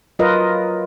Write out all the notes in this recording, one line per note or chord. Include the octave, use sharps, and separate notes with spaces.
F#3 F4 A#4 B4 D#5